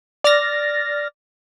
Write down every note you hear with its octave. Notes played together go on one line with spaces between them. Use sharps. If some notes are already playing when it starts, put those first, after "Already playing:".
D5 F6 A6 A#6